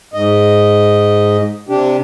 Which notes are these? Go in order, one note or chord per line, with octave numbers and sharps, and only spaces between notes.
G#2 D#5
C3 D4 G4